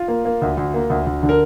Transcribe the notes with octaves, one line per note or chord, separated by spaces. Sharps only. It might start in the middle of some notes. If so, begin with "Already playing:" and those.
Already playing: F4
A#3
A#3
D2
D2
A#3
D2
D2
D3
A#4